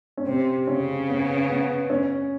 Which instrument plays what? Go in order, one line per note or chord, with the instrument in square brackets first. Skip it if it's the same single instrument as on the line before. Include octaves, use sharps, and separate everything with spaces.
[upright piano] C#4
[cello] C3 [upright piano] C4
[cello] C#3 [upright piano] C#4
[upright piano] B3
B3
C#4